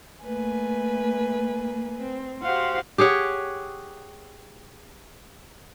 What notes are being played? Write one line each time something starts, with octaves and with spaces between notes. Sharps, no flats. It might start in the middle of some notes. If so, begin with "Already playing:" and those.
A3 A#3 B4 G#5
C4
F#4 G4 C5 F5 F#5 C6
G4 G#4 C#5 F#5